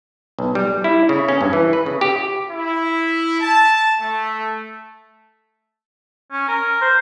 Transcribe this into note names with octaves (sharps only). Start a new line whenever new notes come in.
B1
G3
E4
C#3
C#4
G2
E3
B4
C#3
G4
E4
A5
A3
C#4
A#4
C5